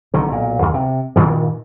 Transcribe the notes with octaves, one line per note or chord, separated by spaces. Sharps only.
B1 D3 D#3
B1 A#2
D#2
C3
G2 A#2 D#3 E3